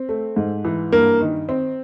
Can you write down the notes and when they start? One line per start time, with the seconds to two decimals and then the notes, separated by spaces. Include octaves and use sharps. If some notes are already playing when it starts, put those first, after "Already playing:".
Already playing: C4
0.09 A3
0.36 G#2
0.64 E3
0.92 G2 A#3
1.21 D#3
1.49 C4